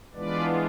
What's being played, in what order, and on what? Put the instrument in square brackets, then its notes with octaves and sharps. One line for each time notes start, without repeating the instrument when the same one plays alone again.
[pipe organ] E3 G#3 B3 D4 F4 B4 D5